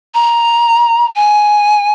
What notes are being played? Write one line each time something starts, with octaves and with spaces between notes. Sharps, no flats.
A#5
G#5